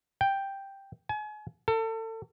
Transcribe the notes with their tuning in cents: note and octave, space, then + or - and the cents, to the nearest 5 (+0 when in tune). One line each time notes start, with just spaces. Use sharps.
G5 +5
G#5 +35
A4 +30